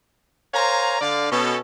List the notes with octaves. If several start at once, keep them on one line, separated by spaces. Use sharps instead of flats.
A#4 C5 C#5 F5 G#5 A#5
D3 D5 F5
B2 C#4 A4